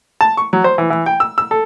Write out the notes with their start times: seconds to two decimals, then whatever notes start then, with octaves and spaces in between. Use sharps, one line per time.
0.21 A5
0.37 C#6
0.53 F#3
0.64 C5
0.78 E3
0.90 E3
1.06 G5
1.20 E6
1.38 E6
1.51 A4